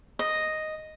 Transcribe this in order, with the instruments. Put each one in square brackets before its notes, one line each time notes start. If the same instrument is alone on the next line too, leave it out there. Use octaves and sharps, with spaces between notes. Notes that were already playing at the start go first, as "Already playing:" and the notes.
[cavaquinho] D#5